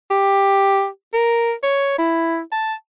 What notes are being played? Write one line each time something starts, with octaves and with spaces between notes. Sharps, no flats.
G4
A#4
C#5
E4
A5